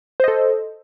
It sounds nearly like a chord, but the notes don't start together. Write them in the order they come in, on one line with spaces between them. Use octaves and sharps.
C5 D#5 A4